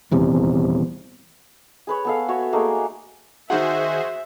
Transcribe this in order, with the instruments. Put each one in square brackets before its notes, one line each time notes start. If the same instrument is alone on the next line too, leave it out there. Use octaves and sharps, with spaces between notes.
[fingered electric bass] D#1 E2 C3
[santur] G#4 B4 C#5
B3 A4 F5
F#4 C#5 E5
A3 A#3 D#4 G#4
[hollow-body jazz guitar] D#3 D#4 F#5 [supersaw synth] F#4 G#4 C5 [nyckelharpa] E5